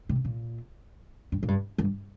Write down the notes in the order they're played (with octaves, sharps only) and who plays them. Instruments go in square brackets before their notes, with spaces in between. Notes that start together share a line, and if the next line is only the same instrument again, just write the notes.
[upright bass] C3
A#2
G2
A#2
G2
G2